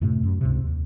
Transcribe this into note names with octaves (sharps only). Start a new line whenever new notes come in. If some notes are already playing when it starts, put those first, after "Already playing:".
F#2 A2 C3 A3
F#2
C#2 G#2 C3
D#2